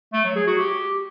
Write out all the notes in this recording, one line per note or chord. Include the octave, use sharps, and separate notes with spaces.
A3
F#3
G#4
F#4
G4